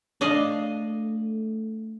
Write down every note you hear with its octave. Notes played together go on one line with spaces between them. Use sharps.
A3 D4 D#5 F5